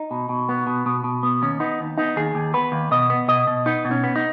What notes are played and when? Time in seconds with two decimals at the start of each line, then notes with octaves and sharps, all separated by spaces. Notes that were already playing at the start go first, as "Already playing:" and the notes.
Already playing: D#4
0.11 B2
0.29 B2
0.49 B3
0.67 B2
0.86 B2
1.04 B2
1.23 B3
1.42 D#2 C#4
1.60 B3 D#4
1.80 D#2
1.98 B3 D#4
2.16 D#2 G#4
2.35 D#2
2.54 B3 B4
2.72 D#2
2.91 B2 D#5
3.10 B3
3.28 B2 D#5
3.47 B2
3.66 B3 D#4
3.85 B2
3.91 C#4
4.04 B3
4.16 D#4